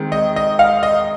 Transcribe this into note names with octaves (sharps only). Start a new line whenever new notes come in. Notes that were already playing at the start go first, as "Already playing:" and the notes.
Already playing: D#3 G#3 C4
D#5
D#5
F5
D#5